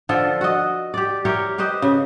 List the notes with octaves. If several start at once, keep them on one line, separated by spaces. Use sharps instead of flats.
D3 F3 F4 A4
F#4 D#5
G4 D5
E4 G4 A#4 C#5
G4 B4 C5 D#5
C#3